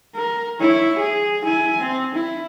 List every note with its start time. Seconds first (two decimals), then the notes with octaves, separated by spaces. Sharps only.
0.16 A#4
0.60 E4 C#5
0.99 G#4
1.45 E4 G#5
1.81 C4
2.14 E4